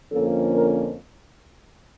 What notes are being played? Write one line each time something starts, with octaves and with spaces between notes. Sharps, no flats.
F2 D3 F3 A#3 C#4 A4
A#4